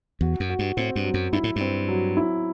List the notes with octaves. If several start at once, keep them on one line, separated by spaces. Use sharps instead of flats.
E2 F#4
F#2
F#4
G2
A2 C4
G2
F#3
F#2
G2 E4
A2
G2
C4
F#3
E4